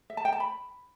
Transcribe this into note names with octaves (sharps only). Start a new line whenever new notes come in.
E5
A5
G5
A5
B5